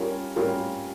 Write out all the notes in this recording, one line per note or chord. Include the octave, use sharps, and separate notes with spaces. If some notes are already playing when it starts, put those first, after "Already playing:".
Already playing: G3 C#4 F4 A#4
G3 C#4 F4 A#4